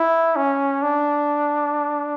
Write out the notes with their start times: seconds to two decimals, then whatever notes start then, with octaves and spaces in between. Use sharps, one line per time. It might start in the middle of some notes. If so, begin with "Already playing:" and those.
Already playing: E4
0.36 C#4
0.83 D4